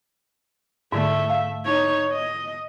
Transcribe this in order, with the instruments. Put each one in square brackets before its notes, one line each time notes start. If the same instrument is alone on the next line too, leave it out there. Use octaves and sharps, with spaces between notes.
[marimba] G#2 D3 [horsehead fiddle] A3 E5
[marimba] F5
[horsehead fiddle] D#4 C#5
D#5